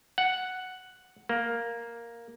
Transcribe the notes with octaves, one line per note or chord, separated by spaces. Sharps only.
F#5
A#3